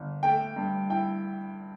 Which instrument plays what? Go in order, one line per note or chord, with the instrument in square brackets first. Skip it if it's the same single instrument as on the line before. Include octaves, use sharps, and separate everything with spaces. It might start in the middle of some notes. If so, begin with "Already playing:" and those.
Already playing: [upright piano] G1
[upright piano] A3 [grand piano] G5
[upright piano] G2
[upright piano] E4 [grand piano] G5